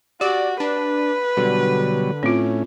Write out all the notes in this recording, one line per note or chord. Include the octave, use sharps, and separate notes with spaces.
F#4 G4 D5 D6
D4 B4
B2 D3 F#3 G3
A2 C4 C#4 F4